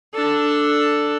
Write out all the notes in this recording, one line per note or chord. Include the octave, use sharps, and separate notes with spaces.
D4 A4